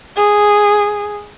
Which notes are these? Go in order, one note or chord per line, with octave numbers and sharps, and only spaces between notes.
G#4